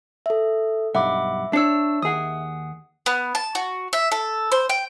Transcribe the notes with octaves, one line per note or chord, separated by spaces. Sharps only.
A4 E5
B1 G2 E5 F#5 B5 D6
D4 C#5 A5 E6
D#2 G#4 F#5 D#6
B3
A5
F#4
E5
A4
C5
G5